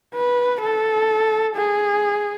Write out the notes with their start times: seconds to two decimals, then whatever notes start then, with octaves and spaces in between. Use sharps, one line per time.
0.14 B4
0.61 A4
1.56 G#4